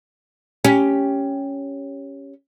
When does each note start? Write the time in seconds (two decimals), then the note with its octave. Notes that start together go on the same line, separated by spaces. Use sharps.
0.64 C#4 G4